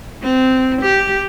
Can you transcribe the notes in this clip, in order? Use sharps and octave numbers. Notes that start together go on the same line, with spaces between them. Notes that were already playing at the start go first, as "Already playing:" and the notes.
C4
G4